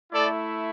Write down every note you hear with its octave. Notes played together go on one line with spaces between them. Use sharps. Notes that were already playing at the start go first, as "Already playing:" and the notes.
A3 E4 A4 D5